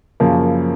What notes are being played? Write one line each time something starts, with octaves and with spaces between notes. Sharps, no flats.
F#2 C#3 F3 A#3